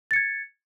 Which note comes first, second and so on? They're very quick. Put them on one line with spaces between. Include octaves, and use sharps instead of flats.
A6 C#7 G#6